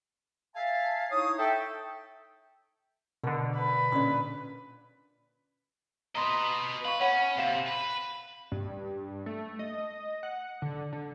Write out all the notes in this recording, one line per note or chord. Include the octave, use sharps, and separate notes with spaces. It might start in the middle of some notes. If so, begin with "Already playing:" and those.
E5 F5 G#5 A5
D#4 E4 C#5 D#6
A4 E5 G5
B2 D3 A#4
B4
A#2 C#4 D4
B4 D#5 A#5 C6
B4 F5 C#6
C#4 C#5 F#5 B5
C3 F5 E7
B4
G2
A3
D#5
F#5
D3
D3